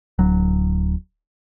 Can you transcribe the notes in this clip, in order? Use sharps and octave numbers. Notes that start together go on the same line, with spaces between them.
D1 F#3